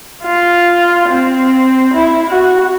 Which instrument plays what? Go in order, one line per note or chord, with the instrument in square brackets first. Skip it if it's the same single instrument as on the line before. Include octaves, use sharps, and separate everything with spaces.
[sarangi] F4
C4
E4
F#4